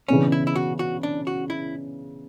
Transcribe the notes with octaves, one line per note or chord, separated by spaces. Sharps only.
C#3 E3 B3 C#4 D4
E4
E4
F#4
F#4
D4
F#4
E4